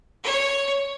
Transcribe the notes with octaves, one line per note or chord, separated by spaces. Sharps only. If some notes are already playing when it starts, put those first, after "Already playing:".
C#5